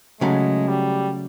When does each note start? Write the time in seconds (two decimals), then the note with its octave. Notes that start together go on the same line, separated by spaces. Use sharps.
0.21 C#3 F#3 G#3 A3
0.68 G3